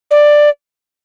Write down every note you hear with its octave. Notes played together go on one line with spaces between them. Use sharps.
D5